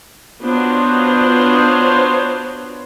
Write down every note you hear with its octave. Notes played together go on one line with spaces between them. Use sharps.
B3 D4 F4 F#4 C5 C#5